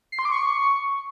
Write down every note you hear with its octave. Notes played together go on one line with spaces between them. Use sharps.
C7
C6
D6
C#6